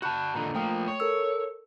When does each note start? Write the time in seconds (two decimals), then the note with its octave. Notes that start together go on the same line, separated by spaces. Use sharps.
0.02 F#4 A5 B5 F#6 G6
0.35 A#2 D3 D#3 A#5
0.55 F3 A3 A#3 G5 D#6
0.88 C#5
1.00 A4 A#4 E6